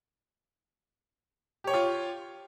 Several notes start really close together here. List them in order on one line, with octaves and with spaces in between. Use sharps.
G4 C#5 G5 F4